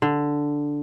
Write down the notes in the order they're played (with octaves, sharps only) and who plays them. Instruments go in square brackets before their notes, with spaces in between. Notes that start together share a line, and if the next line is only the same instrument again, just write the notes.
[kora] D3